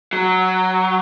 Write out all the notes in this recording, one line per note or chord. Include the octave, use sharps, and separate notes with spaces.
F#3